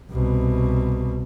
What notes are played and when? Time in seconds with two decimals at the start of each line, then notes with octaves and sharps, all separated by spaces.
0.11 C2 B2